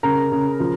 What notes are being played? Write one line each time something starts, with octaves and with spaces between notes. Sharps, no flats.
C#3 A#4 A#5
C#3
F3